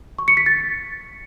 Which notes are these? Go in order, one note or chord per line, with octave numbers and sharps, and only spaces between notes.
C#6
C#7
B6
A6